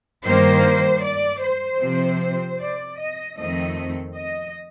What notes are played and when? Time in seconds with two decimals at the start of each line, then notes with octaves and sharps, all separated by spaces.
0.24 G2 D#3 A#3 C5
1.02 D5
1.42 C5
1.81 C3 F3 C4
2.59 D5
2.98 D#5
3.38 F2 D#3 A3 C4 D#5
4.15 D#5